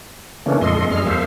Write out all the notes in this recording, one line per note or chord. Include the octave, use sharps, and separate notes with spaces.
C#3 E3 A3 A#3 C#4 D4
F2 A#2 G#3 A4 D#5 C6
F#2 G3 G#4 F6
E2 A#3 A4 C5 E5 F5